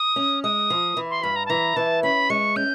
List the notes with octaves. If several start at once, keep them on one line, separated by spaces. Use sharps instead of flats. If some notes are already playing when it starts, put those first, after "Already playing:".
Already playing: D#6
C#4
G#3 D#6
F3
E3
C6
G2 B5
A#5
A5
E3 A#5
E3 A5
C#4 B5
G#3 C#6
C#4 G6